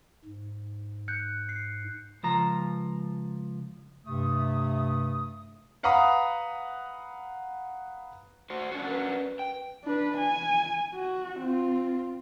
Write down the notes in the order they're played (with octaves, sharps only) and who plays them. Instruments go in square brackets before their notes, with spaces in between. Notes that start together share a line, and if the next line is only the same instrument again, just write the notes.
[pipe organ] G#2
[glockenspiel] F#6 G6 C#7
C7
[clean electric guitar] C#2 F3 A#5
[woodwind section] G2 C3 A3 D#6
[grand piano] B4 F5 F#5 A#5 B5 D#6
[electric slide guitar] F#4 C5
C#4 D4 F#4
[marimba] A#4 B4
[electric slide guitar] G5
[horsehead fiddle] D4 B4
G#5
F#4
C4 F4